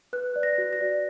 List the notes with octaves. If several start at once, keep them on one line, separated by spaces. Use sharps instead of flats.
B4 F#6
D5
A#6
F#4
A#6
D5